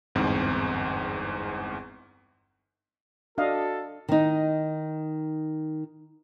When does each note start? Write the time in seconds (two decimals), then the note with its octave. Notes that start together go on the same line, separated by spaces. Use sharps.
0.15 G1 E2 G#2 C4
3.38 D4 F#4 A4 D#5 F5
4.08 D#3 D#4